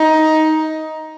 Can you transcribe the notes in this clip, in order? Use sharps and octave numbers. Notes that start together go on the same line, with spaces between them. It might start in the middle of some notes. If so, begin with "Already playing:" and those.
Already playing: D#4